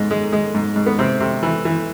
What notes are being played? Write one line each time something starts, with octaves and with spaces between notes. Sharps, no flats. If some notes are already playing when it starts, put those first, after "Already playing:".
Already playing: G#2 G#3
G#3
G#3
G#2
G#2
B3
C3 C4
C3
E3
E3